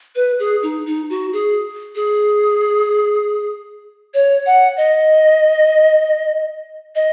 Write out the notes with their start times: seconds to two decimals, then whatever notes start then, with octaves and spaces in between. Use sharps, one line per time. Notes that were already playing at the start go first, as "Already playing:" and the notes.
0.15 B4
0.39 G#4
0.63 D#4
0.86 D#4
1.10 F#4
1.33 G#4
1.95 G#4
4.14 C#5
4.46 F#5
4.77 D#5
6.95 D#5